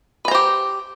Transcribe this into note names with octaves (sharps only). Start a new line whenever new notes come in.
G4 B4 C5 A#5